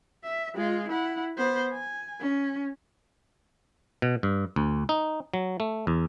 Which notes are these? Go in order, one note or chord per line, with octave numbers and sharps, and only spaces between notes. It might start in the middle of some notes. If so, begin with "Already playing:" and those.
E5
G#3 F4
E4 F#5
B3 C5
G#5
C#4
B2
G2
D2
D#4
F#3
A3
E2